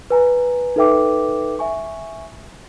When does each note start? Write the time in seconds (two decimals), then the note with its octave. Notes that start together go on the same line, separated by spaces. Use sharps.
0.10 B4 G#5 A#5
0.76 D#4 A4 B4 E5 G5 D6
1.59 E5 G#5 C#6